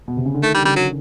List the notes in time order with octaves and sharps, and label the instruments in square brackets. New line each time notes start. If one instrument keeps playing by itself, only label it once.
[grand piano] B2
C3
C#3
D3
[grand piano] D#3 [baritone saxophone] A3
[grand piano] D3 [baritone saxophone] G3
[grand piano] C#3 [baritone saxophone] G3
[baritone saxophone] F#3